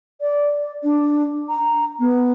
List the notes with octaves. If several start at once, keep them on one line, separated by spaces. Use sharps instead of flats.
D5
D4
A#5
B3